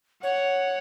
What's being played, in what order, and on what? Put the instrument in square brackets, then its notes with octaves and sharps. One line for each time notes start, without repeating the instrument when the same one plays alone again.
[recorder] C#5 [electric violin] F#5